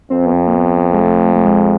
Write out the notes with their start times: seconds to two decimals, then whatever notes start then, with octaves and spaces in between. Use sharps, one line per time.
0.10 F2 C4
0.26 B3
0.33 C4
0.47 A#3
0.55 B3
0.93 G#3
1.01 A3
1.36 A3
1.45 G#3